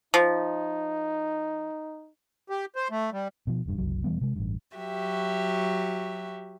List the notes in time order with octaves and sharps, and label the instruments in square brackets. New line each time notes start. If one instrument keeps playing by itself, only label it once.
[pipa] F3 [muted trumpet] D#4
[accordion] G4
C5
A3
G3
[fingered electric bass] B2 F3
E1 G2
F#1 C2 F#3
E1 E3 G3 B3
C3 G#3
A1 G2
[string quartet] F#3 F#4 G4 E5